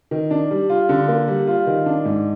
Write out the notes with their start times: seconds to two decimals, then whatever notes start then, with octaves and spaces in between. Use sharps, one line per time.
0.11 D#3
0.31 D4
0.51 G3
0.69 F4
0.89 D3
1.08 A#3
1.28 G3
1.47 F4
1.67 D#3
1.86 D4
2.05 G#2